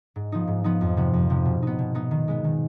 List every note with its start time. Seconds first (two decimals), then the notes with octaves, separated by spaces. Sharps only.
0.16 G#2
0.32 F3 B3 D#4
0.48 G#2
0.64 F3 B3 D#4
0.81 F2
0.97 C3 F3 B3
1.13 F2
1.30 C3 F3 B3
1.45 B2
1.62 B3 D#4
1.79 B2
1.95 B3 D#4
2.11 D#3
2.28 G#3 B3
2.44 D#3